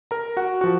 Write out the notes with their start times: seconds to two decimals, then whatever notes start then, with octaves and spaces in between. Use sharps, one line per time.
0.11 A#4 A#5
0.37 F#4 F#5
0.61 F3 F#4 F#5